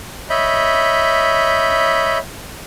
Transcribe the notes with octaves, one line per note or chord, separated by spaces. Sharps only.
C#5 D#5 E5 B5 G6